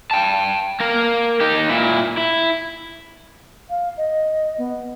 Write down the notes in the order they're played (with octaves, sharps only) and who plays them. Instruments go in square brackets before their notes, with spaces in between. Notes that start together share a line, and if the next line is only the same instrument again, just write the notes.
[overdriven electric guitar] G5 A5
A#3 A#4
D#4 G4
A#2 E4
E4
[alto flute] F5
D#5
B3